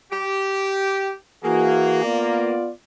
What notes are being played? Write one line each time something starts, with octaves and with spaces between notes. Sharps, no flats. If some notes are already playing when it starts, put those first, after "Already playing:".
G4
E3 A#3 F#4 G#4
B3 F4 D5